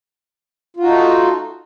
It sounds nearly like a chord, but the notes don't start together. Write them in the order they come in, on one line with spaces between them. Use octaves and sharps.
F4 F#4 D#4 A3